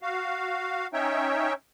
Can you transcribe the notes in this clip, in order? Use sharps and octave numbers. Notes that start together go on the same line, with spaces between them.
F#4 F5
C#4 D#4 C#5 E5 G5